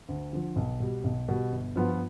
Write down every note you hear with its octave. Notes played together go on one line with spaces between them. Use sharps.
D2
D3 F3
B1
B2 G3
B1
B2 G3
G1
G2 F3 B3 F4